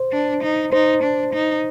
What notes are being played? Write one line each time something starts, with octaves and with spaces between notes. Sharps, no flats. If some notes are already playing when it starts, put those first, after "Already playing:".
Already playing: C5
D4
D#4
D#4 C5
D4
D#4